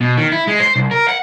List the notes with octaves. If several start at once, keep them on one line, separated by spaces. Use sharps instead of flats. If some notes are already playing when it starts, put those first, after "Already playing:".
B2
D#3
E4
G#3
C5
C2
A#4
F#5